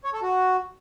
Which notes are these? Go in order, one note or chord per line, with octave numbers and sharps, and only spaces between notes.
C#5
A4
F#4